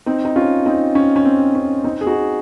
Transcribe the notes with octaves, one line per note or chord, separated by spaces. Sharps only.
C4 D#4
D#4
C#4 F4
C4 D#4
C#4
C#4
C4
C#4
C4 D#4
G#4
D#4 F#4